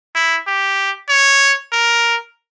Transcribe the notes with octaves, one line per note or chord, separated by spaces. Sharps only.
E4
G4
C#5
A#4